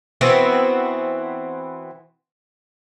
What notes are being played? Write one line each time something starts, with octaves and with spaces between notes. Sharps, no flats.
E3 B3 C4 F#4